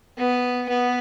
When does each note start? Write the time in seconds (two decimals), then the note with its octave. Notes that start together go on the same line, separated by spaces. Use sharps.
0.18 B3
0.69 B3